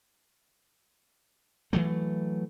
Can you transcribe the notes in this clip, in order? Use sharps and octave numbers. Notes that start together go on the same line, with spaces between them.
E3 F#3 A3